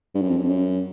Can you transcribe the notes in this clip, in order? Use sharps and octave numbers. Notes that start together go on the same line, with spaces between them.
G2
F#2
F2
F#2
F2
F#2